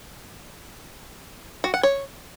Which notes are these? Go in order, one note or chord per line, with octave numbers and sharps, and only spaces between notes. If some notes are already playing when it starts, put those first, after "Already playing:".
F#4
F#5
C#5